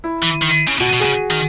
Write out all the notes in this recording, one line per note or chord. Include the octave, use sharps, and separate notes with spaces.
E4
E3
D#3
C#3
B2 F#4
B2
G#4
C#3
D#3